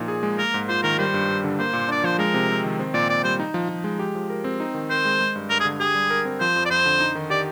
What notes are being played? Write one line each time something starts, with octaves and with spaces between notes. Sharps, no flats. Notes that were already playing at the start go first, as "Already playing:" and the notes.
Already playing: A#2 F3 D#4
G#4
G#3
A#3 A#4
G#2
F4 C5
D#3 A#4
G3 C5
G2
G2
D3
A#3 C5
A#2
D4 D5
F3 C5
G#3 A#4
C3
C4
D#3
C4
A#2 D5
A#2 D5
G3 C5
D#4
F3
F3
G#3
G4
F3
A#4
C4
D#4
D#3
A#4 C5
G#3
G#3
G2
G2 A#4
G#4
D3
G4 G#4
G3
A#4
C4
F3 C5
F2
D5
F2 C5
D3
D#4
D#3
G4 D5